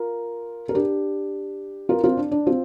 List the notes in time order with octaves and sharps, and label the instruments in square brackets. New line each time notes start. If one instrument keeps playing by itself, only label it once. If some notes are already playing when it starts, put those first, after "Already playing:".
Already playing: [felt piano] F4 A#4
A#4
D4 G4
F4 A#4
C4 F4
D4
D4
C4 F4